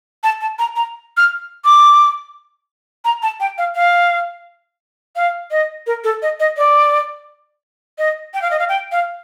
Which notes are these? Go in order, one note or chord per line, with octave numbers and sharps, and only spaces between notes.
A5
A5
A#5
A#5
F6
D6
A#5
A5
G5
F5
F5
F5
D#5
A#4
A4
D#5
D#5
D5
D#5
G5
F5
D#5
F5
G5
F5